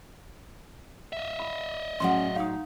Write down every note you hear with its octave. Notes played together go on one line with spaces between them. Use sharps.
D#5 E5
B5
A2 F#3 G#3 C#4 F#5 C6
D#4 F5 D#6